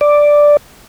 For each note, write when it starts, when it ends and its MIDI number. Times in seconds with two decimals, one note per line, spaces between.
0.01 0.57 74